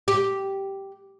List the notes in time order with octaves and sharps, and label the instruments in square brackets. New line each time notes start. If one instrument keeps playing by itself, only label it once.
[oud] G4